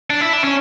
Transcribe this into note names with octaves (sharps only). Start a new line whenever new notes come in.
D4
E4
D4
C#4